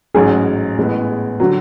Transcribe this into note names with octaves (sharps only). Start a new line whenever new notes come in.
A1 G#2 F#3 C#4 G#4
A1 A2 G#3 B3
D3 F#3 F#4